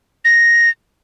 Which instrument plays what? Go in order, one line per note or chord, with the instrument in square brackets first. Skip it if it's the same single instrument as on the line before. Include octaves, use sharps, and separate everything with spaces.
[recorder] A#6